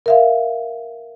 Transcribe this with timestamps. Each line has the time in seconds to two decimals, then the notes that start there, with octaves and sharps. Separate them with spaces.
0.06 A#4 E5 F5